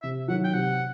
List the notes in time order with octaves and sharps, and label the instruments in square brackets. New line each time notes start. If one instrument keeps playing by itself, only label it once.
[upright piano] C3 [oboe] E5
[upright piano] F#3 [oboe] F#5
[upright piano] D#3
[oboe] G5
[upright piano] C3 [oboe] F#5